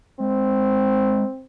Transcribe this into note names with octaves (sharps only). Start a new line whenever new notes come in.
G#3 C4